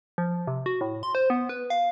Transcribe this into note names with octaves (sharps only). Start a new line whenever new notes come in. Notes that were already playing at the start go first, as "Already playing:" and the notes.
F3
C3
F#4
A2
C6
C5
B3
B4
F5